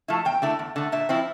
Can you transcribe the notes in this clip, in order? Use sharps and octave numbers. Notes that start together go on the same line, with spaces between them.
F3 A3 E4
E2 G5
D3 A3 E4
E2
D3 A3
A#2 E5
F3 C4 E4